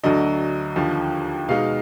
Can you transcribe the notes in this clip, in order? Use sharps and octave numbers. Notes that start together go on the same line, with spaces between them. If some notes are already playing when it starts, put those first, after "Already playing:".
D2 D3 F#3 D4 D#5
D#2 D3 F3
B2 G#3 D#4 F5